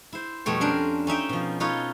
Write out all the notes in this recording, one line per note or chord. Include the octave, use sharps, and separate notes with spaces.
E4 C5
F2 B2 G3 A3 C#5
C#4 D4 A#4 C5
C#4 D#4 E5 G5
B2 F3
D#4 F4 A4 B4 C#5